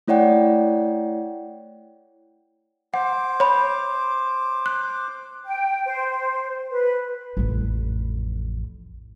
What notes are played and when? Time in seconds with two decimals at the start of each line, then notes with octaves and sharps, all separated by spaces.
0.08 A3 E4 C#5 D5 F#5 G5
2.94 C5 F#5 D6
3.40 C#5 B5
4.66 F#6
5.45 G5
5.85 C5
6.71 B4
7.37 A1 F2